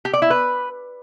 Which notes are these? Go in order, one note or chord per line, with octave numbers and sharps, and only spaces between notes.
G4
D5
E4
B4